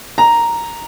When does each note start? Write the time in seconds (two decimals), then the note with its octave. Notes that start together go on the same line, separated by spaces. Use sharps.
0.18 A#5